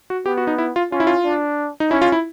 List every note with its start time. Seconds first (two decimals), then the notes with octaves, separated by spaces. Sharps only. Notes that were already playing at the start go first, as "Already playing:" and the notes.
0.10 F#4
0.26 B3 G4
0.38 F#4
0.47 D#4
0.58 E4
0.76 F4
0.92 C#4 F4
1.00 E4
1.07 F4
1.25 D4
1.80 D#4
1.90 C#4 E4
2.02 F4
2.12 E4